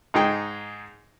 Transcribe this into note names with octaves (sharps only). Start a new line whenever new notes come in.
G#2 D#4 G#4 G5